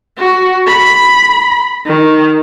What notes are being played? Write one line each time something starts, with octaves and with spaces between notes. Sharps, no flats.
F#4
B5
D#3